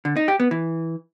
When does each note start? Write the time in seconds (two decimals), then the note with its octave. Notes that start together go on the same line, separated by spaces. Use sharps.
0.05 D3
0.17 D#4
0.28 G4
0.40 B3
0.51 E3